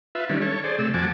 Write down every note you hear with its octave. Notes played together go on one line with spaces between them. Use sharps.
F4 B4 E5
D#3 G3 C#4 D4
A4 C#5
G#4 C5 D5
C3 A3 E6
F2 F3 F#4 G#5 A5 D6